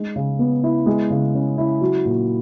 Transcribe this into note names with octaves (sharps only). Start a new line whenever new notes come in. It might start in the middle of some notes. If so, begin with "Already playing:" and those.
Already playing: G#3 D#4
C#3
B3
E4
G#3
C#3
C#4
E4
F#3
A#2